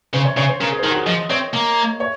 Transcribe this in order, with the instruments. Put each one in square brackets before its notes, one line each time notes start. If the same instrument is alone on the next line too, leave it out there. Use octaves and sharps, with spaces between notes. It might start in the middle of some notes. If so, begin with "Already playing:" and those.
[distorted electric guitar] C#3 [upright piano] C5
[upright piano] C#5
[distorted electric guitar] C#3 [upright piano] C#5
[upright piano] C5
[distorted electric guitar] C#3 [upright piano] A#4
[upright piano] G#4
C5
[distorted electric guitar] D#3 [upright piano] A#4
[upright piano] F#4
G#4
[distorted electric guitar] F3 [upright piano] D#5
[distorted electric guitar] C4 [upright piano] C#5
[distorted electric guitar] A#3
[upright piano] C#5